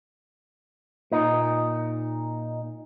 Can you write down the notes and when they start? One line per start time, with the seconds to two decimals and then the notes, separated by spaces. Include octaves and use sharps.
1.12 A#2 D#4